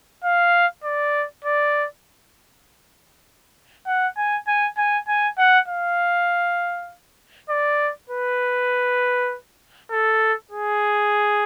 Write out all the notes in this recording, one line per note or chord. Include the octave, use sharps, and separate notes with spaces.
F5
D5
D5
F#5
G#5
G#5
G#5
G#5
F#5
F5
D5
B4
A4
G#4